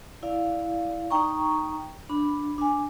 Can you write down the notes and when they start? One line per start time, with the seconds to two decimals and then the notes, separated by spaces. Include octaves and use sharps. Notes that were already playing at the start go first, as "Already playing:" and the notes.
0.23 E4 D5 F5
1.10 D#4 G5 A#5 C#6
2.09 D4 B5
2.58 D4 G#5